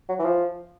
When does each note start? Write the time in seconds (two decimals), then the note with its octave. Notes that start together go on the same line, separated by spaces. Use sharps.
0.09 F#3
0.19 E3
0.25 F3